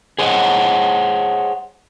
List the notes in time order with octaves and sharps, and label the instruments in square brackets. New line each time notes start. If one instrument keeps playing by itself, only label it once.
[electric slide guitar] G#4 C5 C#5 D#5 F5 F#5